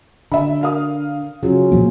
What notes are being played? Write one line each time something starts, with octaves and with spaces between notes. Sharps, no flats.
D3 E5 B5
A#4 F5 D#6
C#3 F#3 C#4 F4
A#2 F3 A#3